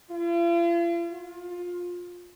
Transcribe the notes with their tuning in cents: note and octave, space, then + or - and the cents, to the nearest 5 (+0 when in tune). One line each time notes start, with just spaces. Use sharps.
F4 -45
F4 +20